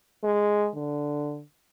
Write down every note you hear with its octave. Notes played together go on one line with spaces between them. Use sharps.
G#3
D3